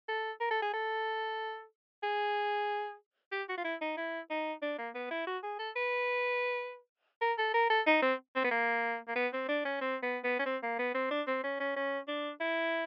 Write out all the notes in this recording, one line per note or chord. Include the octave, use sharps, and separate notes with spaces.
A4
A#4
A4
G#4
A4
G#4
G4
F#4
F4
E4
D#4
E4
D#4
D4
A#3
B3
E4
F#4
G#4
A4
B4
A#4
A4
A#4
A4
D#4
C4
C4
B3
A#3
A#3
B3
C4
D4
C#4
C4
B3
B3
C#4
C4
A#3
B3
C4
D4
C4
C#4
C#4
C#4
D4
E4